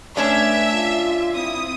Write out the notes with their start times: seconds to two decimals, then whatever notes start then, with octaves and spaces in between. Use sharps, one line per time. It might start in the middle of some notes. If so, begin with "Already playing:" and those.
0.17 A3 C#4 D4 B4 E5
0.74 F4
1.35 C4 E4 D#6